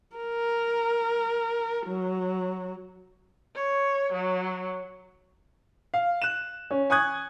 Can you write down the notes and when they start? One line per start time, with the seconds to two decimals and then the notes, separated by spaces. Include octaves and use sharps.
0.16 A#4
1.86 F#3
3.55 C#5
4.13 F#3
5.94 F5
6.22 F#6 E7
6.71 C#4
6.90 G#5 C#6 D#6 F#6 G#6